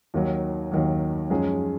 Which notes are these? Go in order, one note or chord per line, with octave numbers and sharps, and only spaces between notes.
D#2 D#3 F#3
D#2 D#3 F#3
F#2 F3 G#3 C#4 G#4